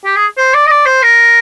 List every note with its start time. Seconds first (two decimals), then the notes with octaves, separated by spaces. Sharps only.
0.05 G4
0.16 G#4
0.37 C5
0.54 D5
0.66 D#5
0.70 D5
0.86 C5
1.02 A#4